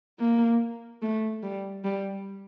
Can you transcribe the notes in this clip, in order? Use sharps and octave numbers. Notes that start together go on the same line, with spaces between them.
A#3
A3
G3
G3